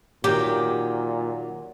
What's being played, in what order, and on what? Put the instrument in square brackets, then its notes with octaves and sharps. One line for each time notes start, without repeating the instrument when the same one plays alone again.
[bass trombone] A#2 [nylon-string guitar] D#3 F#3 [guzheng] G4